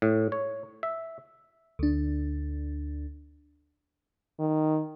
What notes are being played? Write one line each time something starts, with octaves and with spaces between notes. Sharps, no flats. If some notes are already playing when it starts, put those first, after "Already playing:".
A2
C#5
E5
D2 D4
D#3